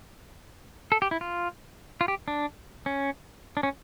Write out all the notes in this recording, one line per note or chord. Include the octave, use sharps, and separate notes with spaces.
A4
G4
E4
F4
F4
G4
D4
C#4
D4
C#4